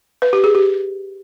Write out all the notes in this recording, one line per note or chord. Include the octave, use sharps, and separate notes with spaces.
B4
G4
G#4
G4